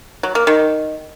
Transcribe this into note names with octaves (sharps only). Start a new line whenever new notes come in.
F#3
A#3
D#3